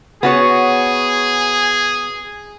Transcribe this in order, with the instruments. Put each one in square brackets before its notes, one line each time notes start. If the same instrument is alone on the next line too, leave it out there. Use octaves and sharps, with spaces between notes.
[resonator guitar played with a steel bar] B3 F#4 C#5 [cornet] G#4